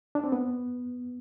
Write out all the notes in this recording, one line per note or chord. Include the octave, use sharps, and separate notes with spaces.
D4
C4
B3